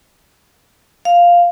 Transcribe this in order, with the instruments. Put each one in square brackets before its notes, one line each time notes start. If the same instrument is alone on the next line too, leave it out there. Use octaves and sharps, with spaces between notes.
[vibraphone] F5